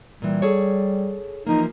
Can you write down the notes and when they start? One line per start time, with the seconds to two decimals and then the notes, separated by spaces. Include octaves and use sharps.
0.22 A#2 E3 G3
0.42 G#4 A4 C#5
1.47 E3 F3 A#3 D#4